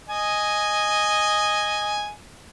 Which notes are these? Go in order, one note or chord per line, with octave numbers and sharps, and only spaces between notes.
D#5 G#5